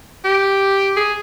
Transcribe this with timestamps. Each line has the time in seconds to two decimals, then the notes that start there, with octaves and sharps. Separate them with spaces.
0.25 G4
0.96 G#4